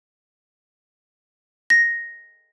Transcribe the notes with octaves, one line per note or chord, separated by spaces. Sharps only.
A#6